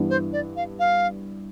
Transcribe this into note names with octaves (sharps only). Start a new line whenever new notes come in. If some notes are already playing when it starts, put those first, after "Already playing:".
Already playing: G2 E3 B3 D4
C5
D5
F5
F5